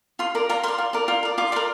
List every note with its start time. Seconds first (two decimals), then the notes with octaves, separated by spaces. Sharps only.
0.19 F4 C6
0.35 A#4 D5
0.49 F4 A#5
0.63 A#4 D5 C6
0.78 F4
0.93 A#4 D5
1.08 F4
1.23 A#4 D5
1.38 F4 D6
1.52 A#4 D5 C6